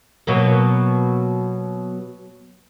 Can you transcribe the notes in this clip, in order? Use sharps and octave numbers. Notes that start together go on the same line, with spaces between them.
B2 F#3 A#3